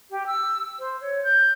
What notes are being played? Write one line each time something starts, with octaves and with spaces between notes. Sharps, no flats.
G4
E6
C5
C#5
G6